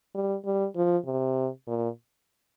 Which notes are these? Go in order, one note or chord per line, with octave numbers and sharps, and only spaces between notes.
G3
G3
F3
C3
A#2